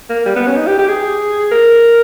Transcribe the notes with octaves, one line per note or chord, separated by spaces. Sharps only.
A#3
G3
B3
C#4
D#4
G4
G4
G#4
A#4